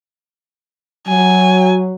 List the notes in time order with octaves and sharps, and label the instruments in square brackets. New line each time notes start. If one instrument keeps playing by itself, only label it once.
[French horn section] F#3 [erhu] G#5